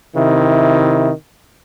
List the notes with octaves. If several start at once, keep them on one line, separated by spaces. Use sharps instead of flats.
C3 D#3 E4